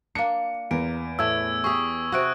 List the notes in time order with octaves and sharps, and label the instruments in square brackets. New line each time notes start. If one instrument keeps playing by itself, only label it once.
[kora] A#3 D4 [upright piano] C#7
[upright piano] E2 [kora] A#4 [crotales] D7
[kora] A2 A3 [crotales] E6 G#6
[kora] G4 G#4 [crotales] C#6 D#6
[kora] C3 F#4 [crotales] C#6 F#6 D7